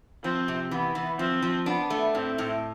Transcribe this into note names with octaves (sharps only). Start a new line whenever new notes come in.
F3 C4
C3
E3 B3
E3
F3 C4
F3
B3 D4
A3
A2 C4
A2